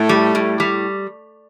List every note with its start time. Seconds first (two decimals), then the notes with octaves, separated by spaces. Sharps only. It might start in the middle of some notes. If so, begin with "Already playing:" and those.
Already playing: A2 A3
0.09 G3
0.35 A2
0.60 G3